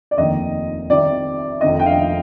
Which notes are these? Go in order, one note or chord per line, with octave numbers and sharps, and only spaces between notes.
D5
F1 D#2 D#3 D#5
C2 C3 D#3 D5
F1 F2 D#3 D#5
G5
F5